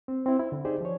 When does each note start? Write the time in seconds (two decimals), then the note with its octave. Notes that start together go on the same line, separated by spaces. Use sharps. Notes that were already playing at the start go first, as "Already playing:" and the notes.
0.08 C4
0.26 C4 E4
0.39 E4
0.52 D3
0.65 D#4 G4 G#4 C5 D5
0.81 F3 C#5